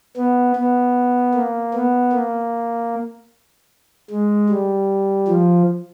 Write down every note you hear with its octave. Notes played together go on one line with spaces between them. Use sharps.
B3
B3
A#3
B3
A#3
G#3
G3
F3